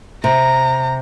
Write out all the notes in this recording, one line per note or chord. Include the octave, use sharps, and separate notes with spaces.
C3 A#5